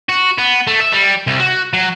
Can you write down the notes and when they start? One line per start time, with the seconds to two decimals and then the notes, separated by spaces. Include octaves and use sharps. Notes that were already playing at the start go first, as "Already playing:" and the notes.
0.09 F#4
0.38 B3
0.67 A3
0.80 E5
0.93 G3
1.27 C2
1.40 F#4
1.73 F#3